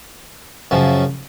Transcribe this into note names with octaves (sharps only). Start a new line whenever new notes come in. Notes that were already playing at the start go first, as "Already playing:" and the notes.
F#2 C#3 F3